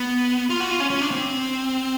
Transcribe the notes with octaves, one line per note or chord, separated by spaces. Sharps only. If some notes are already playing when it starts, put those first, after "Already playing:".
Already playing: B3
F4
F#4
F4
C#4
C#4
D4
C4